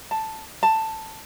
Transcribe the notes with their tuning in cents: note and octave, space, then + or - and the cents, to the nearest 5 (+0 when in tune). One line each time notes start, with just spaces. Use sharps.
A5 +5
A5 +10